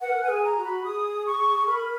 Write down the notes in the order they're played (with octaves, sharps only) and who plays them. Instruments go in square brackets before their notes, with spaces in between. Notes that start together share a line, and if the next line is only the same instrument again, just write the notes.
[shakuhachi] B4 [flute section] F#5
[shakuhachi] A#4
[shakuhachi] B4 [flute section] G#5
[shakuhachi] G#4
[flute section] A#5
[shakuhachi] F#4
[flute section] B5
[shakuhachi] G#4 [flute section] D#6
[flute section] C#6
[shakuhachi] A#4 [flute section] B5